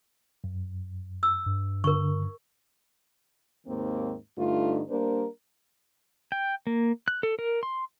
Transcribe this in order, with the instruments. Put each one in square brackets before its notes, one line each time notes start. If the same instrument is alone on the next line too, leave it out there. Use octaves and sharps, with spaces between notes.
[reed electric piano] F#2
[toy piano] E6
[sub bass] G2
[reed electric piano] D3 [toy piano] A#4 C#6
[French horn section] D#2 G#2 D#3 A#3 C4
G2 D3 A3 D#4 F4
G3 A#3 D4 A#4 C5
[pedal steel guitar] G5
A#3
F#6
A4
A#4
C6